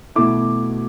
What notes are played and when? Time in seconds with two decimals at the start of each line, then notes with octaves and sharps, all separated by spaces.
0.15 B2 A3 E4 D6